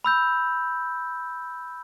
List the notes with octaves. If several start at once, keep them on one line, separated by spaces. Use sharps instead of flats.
B5 E6 G6